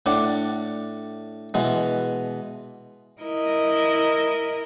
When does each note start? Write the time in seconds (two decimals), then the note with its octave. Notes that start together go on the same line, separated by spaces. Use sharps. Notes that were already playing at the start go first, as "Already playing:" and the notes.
0.06 A2 D4 D5 F#5 D6
1.54 B2 E3 G#3
3.22 E4 A#4 D#5